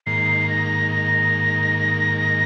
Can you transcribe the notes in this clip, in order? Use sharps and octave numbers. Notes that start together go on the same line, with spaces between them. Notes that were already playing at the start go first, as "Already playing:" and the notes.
G#2 D#3 A#3 C7
A#6
A#6